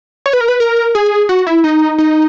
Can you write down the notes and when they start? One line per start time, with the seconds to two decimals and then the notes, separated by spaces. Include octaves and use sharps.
0.26 C#5
0.33 B4
0.41 A#4
0.48 B4
0.60 A#4
0.95 G#4
1.29 F#4
1.47 E4
1.64 D#4
1.98 D#4